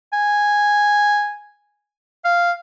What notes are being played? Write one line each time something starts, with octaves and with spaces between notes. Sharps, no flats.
G#5
F5